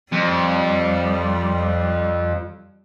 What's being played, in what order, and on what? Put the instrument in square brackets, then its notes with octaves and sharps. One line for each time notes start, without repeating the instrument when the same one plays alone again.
[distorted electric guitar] F2 [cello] G3